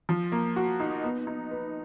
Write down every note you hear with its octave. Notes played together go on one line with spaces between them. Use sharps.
F3
A#3
F#4
D#4
B3
D#4
B4